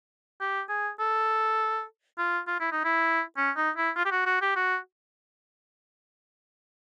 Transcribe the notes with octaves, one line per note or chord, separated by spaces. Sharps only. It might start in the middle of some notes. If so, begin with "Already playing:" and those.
G4
G#4
A4
F4
F4
E4
D#4
E4
C#4
D#4
E4
F4
G4
F#4
F#4
G4
F#4